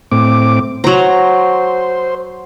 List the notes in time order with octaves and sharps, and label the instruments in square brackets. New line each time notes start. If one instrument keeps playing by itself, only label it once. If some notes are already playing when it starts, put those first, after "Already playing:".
[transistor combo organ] A2 C4 D6
[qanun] F#3 A#5 [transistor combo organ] C5